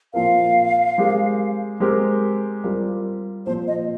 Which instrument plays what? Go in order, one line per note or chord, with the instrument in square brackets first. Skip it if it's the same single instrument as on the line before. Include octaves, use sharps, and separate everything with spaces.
[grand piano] A#2 F3 C4 F4 A#4 [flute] F5
[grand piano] G#3 C4 G4 A#4
G#3 C4 G4 A#4
G3 C4 F4 A#4
[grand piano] A#2 F3 C4 [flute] C5
[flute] D#5